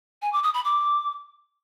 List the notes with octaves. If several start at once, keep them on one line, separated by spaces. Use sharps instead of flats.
G#5
D6
D#6
B5
D6